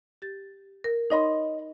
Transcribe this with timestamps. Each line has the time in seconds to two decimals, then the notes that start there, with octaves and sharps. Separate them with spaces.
0.22 G4 A6
0.84 A#4
1.10 D#4 C#5 D#5 B5 C6